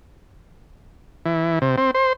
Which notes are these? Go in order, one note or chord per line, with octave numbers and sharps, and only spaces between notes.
E3
C3
C4
C5